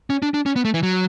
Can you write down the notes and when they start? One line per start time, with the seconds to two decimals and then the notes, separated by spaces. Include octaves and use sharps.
0.10 C#4
0.22 D4
0.34 D4
0.46 C#4
0.56 B3
0.65 A3
0.74 E3
0.83 F#3